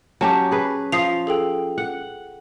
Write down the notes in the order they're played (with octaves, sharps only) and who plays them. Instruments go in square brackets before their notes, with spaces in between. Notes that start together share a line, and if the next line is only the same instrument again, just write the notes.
[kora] F#3 C#4 G4 [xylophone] A5
[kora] G#4 B4
[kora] F3 [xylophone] D#6 C7 F7
[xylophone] G#4 A4 G5
[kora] F#5